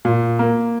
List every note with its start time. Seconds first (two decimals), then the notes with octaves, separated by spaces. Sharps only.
0.05 A#2
0.39 A#3